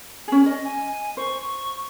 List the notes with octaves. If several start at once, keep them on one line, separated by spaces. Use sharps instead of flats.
C#4 G#4
D#5
G#5
C5 C#6